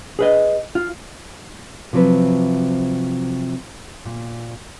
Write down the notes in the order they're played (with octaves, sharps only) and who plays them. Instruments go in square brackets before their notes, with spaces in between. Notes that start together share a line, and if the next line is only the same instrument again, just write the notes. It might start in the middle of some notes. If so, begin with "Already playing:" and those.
[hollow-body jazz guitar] G#4 B4 D#5
F4
[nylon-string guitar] C3 F3 F#3 C4 B4
A#2